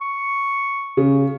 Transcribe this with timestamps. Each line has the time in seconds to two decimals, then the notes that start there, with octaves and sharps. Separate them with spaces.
0.01 C#6
0.97 C#3